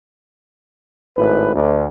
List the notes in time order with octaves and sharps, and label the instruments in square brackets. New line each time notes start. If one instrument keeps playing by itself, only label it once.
[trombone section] G#1 A2 B4
D2